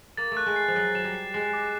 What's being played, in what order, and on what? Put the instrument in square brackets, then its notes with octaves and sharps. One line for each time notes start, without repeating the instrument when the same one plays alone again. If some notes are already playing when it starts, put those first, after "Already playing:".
[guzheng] A#3 [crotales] A6
[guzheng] A3
[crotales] F#6
[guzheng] G#3
[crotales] C7
[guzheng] F3
[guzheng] F#3 [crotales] F#6
[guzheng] F#3 [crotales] E7
[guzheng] G3
[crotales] C7
[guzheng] G#3 [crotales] C7
[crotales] D6